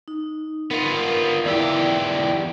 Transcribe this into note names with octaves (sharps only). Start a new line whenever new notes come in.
D#4
B3 F4 A#4
E2 E3 E4 G4 D5